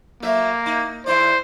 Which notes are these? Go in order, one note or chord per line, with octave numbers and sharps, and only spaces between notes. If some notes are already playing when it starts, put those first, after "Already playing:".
F#3 A3 A#3 E5
D#4
E2 E4 C5 D5